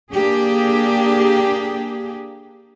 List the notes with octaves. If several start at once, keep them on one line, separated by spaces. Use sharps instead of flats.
A#3 D4 G4 G#4